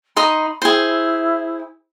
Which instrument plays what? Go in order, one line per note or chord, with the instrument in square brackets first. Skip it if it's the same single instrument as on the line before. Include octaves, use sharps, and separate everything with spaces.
[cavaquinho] D#4 D#5 C6 [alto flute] B5
[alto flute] E4 [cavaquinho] G#4 C5